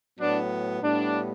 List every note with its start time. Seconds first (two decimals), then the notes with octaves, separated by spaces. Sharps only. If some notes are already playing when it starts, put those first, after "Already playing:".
0.19 A2 F#3 B3 D4
0.82 A2 G3 B3 D4